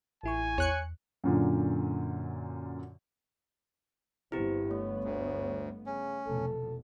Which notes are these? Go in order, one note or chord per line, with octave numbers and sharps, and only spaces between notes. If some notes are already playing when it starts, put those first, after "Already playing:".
A1 E4 G#5 C#6
E2 C#5 F#6 C#7
F#2 A#2 D3
G1 G2 B3 C4 E4 G4
A3 C#5
D2
C#3 C#4
F1 E2 B2 A4